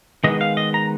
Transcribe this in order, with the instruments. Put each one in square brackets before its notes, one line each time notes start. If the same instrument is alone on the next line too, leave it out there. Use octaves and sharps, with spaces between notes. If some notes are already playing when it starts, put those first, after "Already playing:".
[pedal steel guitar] D#3 G#3 B3 D#5
F5
D#5
A#5